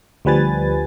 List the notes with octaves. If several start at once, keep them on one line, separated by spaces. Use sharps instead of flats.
D2 F3 G3 B4 G#5 A6